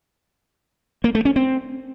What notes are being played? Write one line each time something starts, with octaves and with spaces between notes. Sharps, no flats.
A#3
A3
C#4
C4